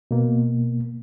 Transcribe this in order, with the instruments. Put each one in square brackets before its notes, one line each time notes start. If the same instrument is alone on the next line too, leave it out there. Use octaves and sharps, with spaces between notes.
[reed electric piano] B2 A#3